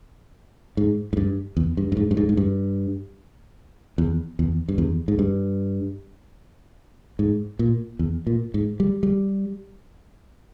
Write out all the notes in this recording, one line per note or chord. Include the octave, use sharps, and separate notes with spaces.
G#2
G#2
G2
E2
G2
G2
G#2
G2
G#2
G#2
G2
E2
E2
G2
E2
G#2
G2
G#2
A#2
E2
A#2
G#2
G3
G3